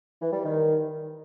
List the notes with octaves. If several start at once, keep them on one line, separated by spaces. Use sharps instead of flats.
E3
G3
D#3